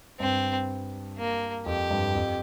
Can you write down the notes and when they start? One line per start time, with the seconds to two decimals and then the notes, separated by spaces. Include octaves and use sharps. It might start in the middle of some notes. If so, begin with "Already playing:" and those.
0.20 G2 C4
1.18 A#3
1.66 F2 G4
1.91 G2
2.15 F2